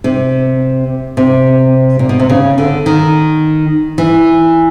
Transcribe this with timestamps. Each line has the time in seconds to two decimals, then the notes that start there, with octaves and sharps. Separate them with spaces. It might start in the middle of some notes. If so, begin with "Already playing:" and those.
0.04 C3
1.17 C3
1.99 A#2
2.09 B2
2.20 C3
2.29 C#3
2.58 D3
2.86 D#3
3.98 E3